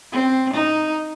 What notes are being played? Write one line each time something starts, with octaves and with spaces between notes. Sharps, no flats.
C4
D#4